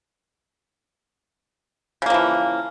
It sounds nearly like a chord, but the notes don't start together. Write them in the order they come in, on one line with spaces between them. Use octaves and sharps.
C#3 A#3 F3 E3